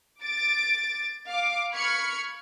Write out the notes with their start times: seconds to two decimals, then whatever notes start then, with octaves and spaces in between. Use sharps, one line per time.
0.22 D6 A6 D7
1.27 F5 D6
1.73 B5 C#6 F6 G#6 C#7